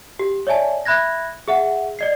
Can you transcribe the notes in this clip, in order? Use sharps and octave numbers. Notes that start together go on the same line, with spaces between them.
G4
C#5 D5 E5 G#5 A5
E5 B5 F#6 G#6 A#6
G#4 E5 F#5
D5 D#5 C7